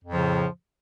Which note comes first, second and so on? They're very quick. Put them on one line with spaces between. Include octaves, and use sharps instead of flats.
F2 A2 F3 C#3